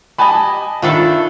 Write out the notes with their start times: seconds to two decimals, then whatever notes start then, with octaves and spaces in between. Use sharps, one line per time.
0.18 G4 D#5 G#5 A5 B5
0.82 D#3 D4 F4 A4 E5 B5 C#6